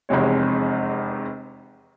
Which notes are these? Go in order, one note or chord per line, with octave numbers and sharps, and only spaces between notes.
F1 E2 C3 G#3 C#5